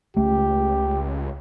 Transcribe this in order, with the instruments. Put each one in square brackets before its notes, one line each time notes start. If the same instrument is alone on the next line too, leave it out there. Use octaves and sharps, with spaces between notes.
[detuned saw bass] C#2 [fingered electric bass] A3 [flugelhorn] G4